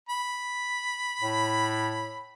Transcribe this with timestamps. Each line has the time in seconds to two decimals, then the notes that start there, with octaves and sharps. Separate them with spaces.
0.09 B5
1.21 A2